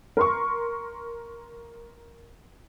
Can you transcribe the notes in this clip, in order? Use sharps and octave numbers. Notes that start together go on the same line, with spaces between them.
A#4 C6 C#6